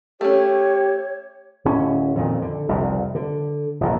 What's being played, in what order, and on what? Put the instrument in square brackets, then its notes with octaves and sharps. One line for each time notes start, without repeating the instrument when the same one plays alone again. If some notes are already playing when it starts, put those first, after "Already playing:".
[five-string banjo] A3 C#4 [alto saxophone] G4 [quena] C#5
[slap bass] D1 C#4
F2 A#2 D#3
D3
F1 C2 F2
D3
E1 A#1 C#3